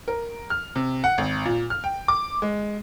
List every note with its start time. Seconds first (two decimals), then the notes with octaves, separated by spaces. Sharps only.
0.08 A#4
0.50 F6
0.76 C3
1.04 F#5
1.18 G#1
1.45 A#2
1.70 F6
1.84 G5
2.08 D6
2.42 G#3